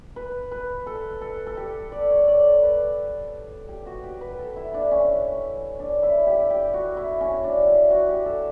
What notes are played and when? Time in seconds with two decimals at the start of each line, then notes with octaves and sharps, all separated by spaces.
0.16 B4
0.52 B4
0.87 A4
1.21 A4
1.47 A4
1.57 G4
1.92 D5
2.11 C#5
2.28 D5
2.63 B4
3.69 G4
3.86 F#4
4.04 G4
4.21 B4
4.39 A4
4.56 E4
4.74 D4
4.91 C#4
5.80 D4
6.03 E4
6.27 G4
6.50 G4
6.74 F#4
6.97 E4
7.21 C#4
7.44 D4
7.67 E4
7.90 F#4
8.08 G4
8.26 A4